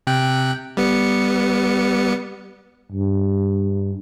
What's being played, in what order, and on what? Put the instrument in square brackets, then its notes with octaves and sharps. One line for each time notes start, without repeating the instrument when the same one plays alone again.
[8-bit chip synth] C3 G5 F#6
G3 B3 C#7
[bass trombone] G2